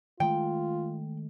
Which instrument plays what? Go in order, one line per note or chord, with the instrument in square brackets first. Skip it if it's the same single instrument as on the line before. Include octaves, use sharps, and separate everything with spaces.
[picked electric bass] D#3 G#3 A3 [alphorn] F4 [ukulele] G5